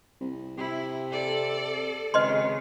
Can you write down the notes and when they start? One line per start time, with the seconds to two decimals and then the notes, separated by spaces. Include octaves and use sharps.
0.20 C2
0.58 C3 E4
1.11 A4 D5
2.14 G#1 C#3 B4 D#5 C6